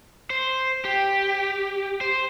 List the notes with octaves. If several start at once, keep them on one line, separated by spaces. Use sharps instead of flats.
C5
G4
C5